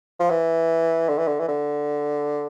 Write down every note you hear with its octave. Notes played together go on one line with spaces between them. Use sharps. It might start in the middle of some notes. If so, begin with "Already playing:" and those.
F3
E3
D3
E3
D3
E3
D3